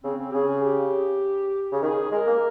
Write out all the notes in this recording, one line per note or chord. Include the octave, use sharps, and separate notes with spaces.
C#3 C4
C4
C#3 G#4
G#4
G4
C#3
D#3 G#4
G#3 A#4
A#3